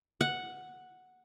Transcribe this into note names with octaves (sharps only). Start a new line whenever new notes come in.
F#5